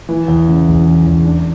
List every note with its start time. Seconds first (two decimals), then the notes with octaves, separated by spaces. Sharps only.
0.09 E3
0.28 E2
0.48 C#3
0.68 E1
0.86 E3
1.06 E2
1.25 D4